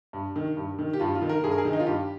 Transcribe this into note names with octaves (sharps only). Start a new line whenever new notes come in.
G2
D#3
G2
D#3
G4
G2 F4
F4
D#3
A#4
G2 G#4
A#4
G#4
D#3
D#4
F4
G2 G4